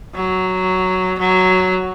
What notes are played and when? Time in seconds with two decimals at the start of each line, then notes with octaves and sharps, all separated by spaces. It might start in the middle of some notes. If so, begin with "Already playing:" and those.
0.15 F#3
1.19 F#3